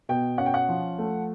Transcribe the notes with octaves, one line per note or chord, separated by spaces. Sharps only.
B2 G5
C#4 F#5
G5
F#5
F3
A3